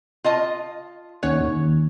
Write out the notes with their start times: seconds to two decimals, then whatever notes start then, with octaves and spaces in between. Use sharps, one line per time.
0.24 F4 D#5 A5
1.23 D#2 C#4 C#5 F#5
1.41 D#2